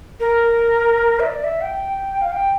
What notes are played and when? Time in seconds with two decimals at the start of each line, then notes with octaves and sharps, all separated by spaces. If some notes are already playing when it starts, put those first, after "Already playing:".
0.20 A#4
1.20 E5
1.26 D5
1.44 E5
1.61 G5
2.21 F5
2.32 G5